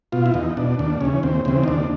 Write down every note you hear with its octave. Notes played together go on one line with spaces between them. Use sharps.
B2 F4
E4
E2 D#4
B2 D4
D#2 D4
C#3 E3 C#4
D#2 C4
C#3 E3 C4
D#4
D#2 D4